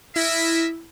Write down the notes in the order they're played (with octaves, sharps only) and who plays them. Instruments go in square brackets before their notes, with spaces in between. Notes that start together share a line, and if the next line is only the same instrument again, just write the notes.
[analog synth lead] E4 [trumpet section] A#4 D#5 E5